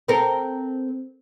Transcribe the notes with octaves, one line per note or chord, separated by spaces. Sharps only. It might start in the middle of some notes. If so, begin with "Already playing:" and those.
C4 A4 A#4